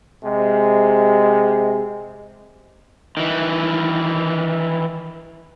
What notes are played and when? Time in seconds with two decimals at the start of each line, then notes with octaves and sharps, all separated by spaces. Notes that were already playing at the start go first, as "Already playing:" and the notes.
0.23 C3 G#3
3.17 D#3 E3